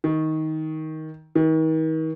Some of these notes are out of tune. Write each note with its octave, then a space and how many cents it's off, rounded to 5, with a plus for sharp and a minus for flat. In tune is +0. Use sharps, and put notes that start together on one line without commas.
D#3 +15
D#3 +40